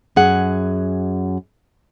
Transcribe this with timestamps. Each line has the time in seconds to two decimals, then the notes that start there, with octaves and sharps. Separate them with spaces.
0.16 F#2 G#4 F#5